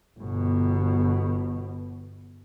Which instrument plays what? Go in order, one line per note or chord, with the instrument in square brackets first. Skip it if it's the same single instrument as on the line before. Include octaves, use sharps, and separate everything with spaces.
[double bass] G1 B2